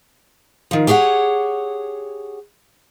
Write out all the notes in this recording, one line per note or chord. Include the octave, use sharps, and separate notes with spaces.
D#3 F3
G4 G#4 C#5 E5 F#5